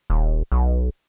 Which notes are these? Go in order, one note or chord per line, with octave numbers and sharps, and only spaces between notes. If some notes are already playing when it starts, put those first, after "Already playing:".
D#1
B1